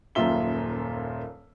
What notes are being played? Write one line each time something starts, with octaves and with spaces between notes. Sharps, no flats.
D#1 F#2 A#2 F4 E5 G7